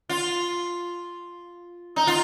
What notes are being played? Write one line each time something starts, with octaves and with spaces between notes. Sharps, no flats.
F4
D#4
F4